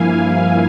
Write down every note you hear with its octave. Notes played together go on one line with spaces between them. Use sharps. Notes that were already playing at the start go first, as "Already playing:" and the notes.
Already playing: G2 F3 A#3 E4 F5 G#5